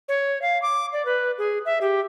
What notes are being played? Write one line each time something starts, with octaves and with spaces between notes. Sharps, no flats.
C#5
F5
D6
D5
B4
G#4
E5
G4